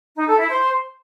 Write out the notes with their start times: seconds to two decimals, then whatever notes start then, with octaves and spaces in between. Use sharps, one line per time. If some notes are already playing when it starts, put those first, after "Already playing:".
0.16 D#4
0.27 A4
0.38 E4
0.49 C5